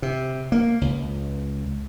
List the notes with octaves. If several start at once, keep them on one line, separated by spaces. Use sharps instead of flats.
C3
A#3
C#2